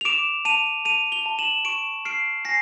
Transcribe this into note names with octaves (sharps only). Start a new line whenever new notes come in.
F7
D6 D7 E7
A5 D#7 F7
A5 D#7 F7
F7 G7
A5
E7 F#7
C#6 D7 E7
F6 C7 D7
G#5 A#6 C7